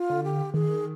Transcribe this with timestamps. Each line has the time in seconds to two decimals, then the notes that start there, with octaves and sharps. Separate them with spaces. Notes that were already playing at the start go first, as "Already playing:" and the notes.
Already playing: F4
0.09 D3
0.24 G4
0.53 D#3 G#4